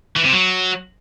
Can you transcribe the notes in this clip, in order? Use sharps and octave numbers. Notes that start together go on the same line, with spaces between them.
E3
C3
F#3